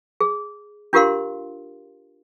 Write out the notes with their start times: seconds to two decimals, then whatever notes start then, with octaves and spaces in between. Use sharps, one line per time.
0.20 G#4
0.93 D4 F4 G4 A#4 F5 C6